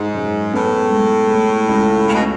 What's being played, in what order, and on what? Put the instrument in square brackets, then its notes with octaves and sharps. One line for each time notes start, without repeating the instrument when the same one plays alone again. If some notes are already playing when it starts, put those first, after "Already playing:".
Already playing: [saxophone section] G#2 [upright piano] G#3
[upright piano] F#2
[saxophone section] A2 [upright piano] B3
[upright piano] G#3
A3
C#2
[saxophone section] C#3 [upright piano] A3
[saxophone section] B2